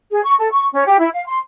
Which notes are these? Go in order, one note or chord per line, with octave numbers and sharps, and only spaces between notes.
G#4
C#6
A4
C#6
C#4
G4
E4
F5
C6